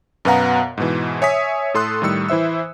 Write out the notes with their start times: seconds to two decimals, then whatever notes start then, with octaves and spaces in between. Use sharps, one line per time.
0.25 F#2 B2 B3 F5 F#5 A#5
0.78 G#2 B2 E3
1.22 C#5 E5 G#5 D#6 B6
1.74 A2 A4 C6 D#6 F#6
2.02 A2 D#3 G3 E6 C#7
2.28 E3 E4 C5 E5 E6